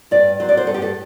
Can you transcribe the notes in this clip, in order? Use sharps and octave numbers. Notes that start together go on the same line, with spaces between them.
G2 D5
F#3 C5
D5
C5
G2 A4
G4
A4